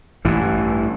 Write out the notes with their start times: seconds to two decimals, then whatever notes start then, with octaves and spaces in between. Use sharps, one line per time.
0.25 A1 G2 E3